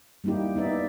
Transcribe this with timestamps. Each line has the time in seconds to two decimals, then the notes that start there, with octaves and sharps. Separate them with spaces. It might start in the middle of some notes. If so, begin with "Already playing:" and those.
0.24 G3 A#3 D#4 E4 G4
0.56 B3 D#4 D5 E5